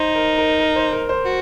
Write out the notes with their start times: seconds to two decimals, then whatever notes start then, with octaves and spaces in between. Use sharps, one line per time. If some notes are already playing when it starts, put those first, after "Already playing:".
Already playing: D#4 C5
0.15 A#4
0.38 A#4
0.60 A#4
0.76 C5
0.92 A#4
1.09 C5
1.25 F#4